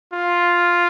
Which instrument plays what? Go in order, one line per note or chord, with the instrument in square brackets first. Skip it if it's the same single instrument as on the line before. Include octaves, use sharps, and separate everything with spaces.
[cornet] F4